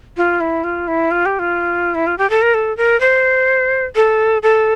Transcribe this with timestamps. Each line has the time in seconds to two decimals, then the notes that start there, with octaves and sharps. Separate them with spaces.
0.17 F4
0.41 E4
0.64 F4
0.88 E4
1.11 F4
1.26 G4
1.39 F4
1.95 E4
2.07 F4
2.18 G4
2.30 A4
2.42 A#4
2.54 A4
2.77 A#4
3.00 C5
3.96 A4
4.43 A4